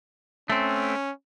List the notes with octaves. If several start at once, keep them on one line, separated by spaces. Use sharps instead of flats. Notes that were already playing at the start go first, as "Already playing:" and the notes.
A3 C4 C#4